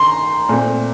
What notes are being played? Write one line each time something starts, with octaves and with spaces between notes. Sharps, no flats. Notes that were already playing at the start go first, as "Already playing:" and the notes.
Already playing: D#3 A#5 C6
A#2 A3 C4